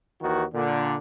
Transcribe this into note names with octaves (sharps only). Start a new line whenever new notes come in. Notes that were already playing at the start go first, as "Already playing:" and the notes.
D#2 D#3 E3 F#4
A#2 D3